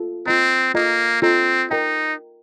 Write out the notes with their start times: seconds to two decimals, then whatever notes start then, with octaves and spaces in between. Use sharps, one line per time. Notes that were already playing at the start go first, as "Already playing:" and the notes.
Already playing: F4 A4
0.26 C4 F4 A4 D#5 A#5
0.74 A#3 F4 A4 D#5 A#5
1.22 C4 F4 A4 D#5 A#5
1.71 D#4 A#4 D#5 G5 A#5